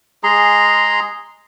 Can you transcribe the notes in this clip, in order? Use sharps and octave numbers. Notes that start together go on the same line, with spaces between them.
G#3 G#4 A#5 C6